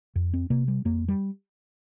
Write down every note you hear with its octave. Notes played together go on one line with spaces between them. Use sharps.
F2
C4
C3 A#3
G3
F2 A#3
G3